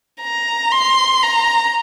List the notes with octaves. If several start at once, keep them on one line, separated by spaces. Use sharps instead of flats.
A#5
C6
A#5